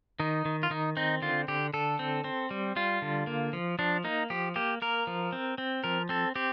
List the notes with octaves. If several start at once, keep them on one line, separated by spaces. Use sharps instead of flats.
D#3 D#4
D#3
F4
D#3 D#4
C4 D#4
D3 F4
D3 G4
D3 A4
C4
C4
G3
G3 F4
D3
A#3
F3
F3 D4
A#3 D#4
F3 G4
A#3 G4
A#3 A#4
F3
C4
C4
F3 A#4
C4 A4
C4 G4